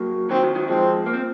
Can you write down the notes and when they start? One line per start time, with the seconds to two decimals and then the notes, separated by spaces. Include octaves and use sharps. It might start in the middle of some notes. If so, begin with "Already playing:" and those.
Already playing: F#3 A#3
0.29 D#3 F#3 C4
0.43 D#3 F#3
0.55 D#3 F#3
0.67 F3 G#3 C4
1.06 A#3
1.13 C4